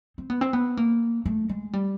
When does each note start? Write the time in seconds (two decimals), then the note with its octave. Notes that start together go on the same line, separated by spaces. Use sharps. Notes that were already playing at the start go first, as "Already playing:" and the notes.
0.18 C4
0.30 B3
0.41 C4
0.53 B3
0.77 A#3
1.25 A3
1.49 G#3
1.73 G3